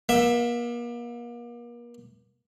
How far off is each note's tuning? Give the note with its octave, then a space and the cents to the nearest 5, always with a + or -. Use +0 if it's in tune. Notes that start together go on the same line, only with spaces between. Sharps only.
A#3 +40 E5 +0